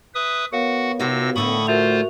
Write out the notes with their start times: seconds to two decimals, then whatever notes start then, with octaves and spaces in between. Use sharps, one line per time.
0.14 B4 E5 D#6
0.52 B3 F#4 A#4 C#5 F5 F#5
1.00 C3 D#4 F4 F#4 E6 A#6
1.36 A2 D3 A3 B5 C#6 D#6
1.67 F4 F#4 A#4 C5 E5 F7